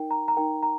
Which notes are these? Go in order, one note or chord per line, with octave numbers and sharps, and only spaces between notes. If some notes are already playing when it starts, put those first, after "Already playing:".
Already playing: D#4 A#4 G5
A#5
A#5
D#4 A#4 G5
A#5